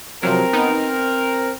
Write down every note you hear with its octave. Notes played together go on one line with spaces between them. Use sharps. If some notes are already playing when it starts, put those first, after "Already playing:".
C3 F3 F#3 C4 A#4
B3 D#4